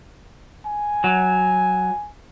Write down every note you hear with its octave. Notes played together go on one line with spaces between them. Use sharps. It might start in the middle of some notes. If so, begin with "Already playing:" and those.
G#5
F#3